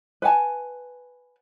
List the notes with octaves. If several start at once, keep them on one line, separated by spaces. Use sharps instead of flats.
B4 F#5 G#5 A5